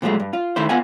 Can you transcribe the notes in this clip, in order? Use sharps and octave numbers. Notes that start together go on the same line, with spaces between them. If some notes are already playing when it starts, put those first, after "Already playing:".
A#2 F3 F#3 G#3 A3
G2
F4
D#3 A3 E4 C5
B3 F4 F#5 G#5